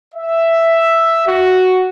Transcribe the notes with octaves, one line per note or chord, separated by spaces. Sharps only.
E5
F#4